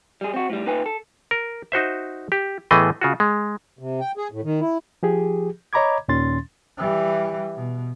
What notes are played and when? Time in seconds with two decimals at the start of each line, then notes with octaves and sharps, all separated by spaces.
0.21 G3 G#4
0.34 C4 F#4
0.50 A2 G3
0.66 A#2 D#4 B4 G5 G#5
0.86 A4
1.31 A#4
1.72 D#4 F#4 C5 E5
2.32 G4
2.71 A2 E3 A3 B3 G#4 D#5
3.01 C#3 F4 F#4
3.20 G#3
3.79 C3
4.00 G5
4.17 G#4
4.32 A2
4.44 D#3
4.61 E4
5.03 F3 G4 G#4
5.73 C#5 D#5 A#5 B5 D6 G#6
6.08 D#2 A#2 D#3 C#4 C6 A6
6.77 E3 G3
7.55 B2